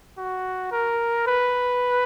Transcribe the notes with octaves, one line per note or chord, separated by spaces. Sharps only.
F#4
A#4
B4